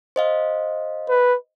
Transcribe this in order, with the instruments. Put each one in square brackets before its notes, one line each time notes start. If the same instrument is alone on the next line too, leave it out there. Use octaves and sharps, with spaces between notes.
[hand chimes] C5 D#5 F5
[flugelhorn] B4